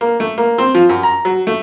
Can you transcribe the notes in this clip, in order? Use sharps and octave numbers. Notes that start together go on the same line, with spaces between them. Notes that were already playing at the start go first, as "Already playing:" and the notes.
A#3
A3
A#3
C4
F3
F#2
A#5
F#3
A3